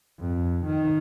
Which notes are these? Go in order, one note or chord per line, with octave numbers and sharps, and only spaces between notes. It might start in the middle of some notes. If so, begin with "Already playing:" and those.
F2
D#3